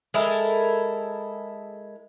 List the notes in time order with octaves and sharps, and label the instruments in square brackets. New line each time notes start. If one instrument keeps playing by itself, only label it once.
[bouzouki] G#3 E4 A4 A#4